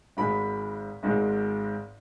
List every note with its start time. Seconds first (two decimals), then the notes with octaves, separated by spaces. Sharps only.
0.17 G#1 G#2 G#3 B5
1.03 G#1 G#2 G#3